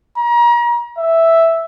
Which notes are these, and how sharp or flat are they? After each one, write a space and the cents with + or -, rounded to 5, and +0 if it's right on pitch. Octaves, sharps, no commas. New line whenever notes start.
A#5 +35
E5 +0